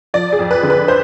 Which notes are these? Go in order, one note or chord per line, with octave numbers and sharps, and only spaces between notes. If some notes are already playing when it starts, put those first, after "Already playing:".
F3 D5
G#4
F2
B4
D3
B4
C5